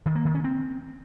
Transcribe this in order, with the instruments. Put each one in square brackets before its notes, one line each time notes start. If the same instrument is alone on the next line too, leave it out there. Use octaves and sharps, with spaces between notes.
[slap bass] D#3
A#3
D#3
C#4
C4